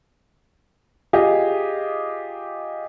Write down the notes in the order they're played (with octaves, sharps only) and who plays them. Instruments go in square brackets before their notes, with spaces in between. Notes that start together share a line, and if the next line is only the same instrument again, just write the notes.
[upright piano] F4 G4 G#4 D#5